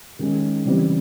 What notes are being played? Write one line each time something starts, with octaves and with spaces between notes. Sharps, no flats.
D#3 G#3 C#4
C#3 E3 G3 C4